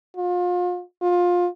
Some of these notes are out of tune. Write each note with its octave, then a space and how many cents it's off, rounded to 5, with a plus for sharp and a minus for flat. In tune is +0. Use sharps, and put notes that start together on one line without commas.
F4 +35
F4 +20